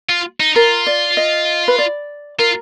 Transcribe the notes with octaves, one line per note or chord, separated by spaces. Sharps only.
F4
D#4
F4 A#4
D5
D#5
B4
D5
F4 A#4